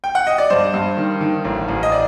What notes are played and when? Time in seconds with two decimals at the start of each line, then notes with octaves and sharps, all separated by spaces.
0.04 G5
0.15 F#5
0.27 D#5
0.38 D5
0.50 G2 C5
0.74 G2
0.97 D#3
1.21 D#3
1.45 A1
1.68 A1
1.83 D#5
1.92 D5